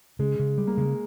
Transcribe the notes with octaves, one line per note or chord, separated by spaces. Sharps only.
C#3 G#3
C#3
G3
A#3
C#3 G#3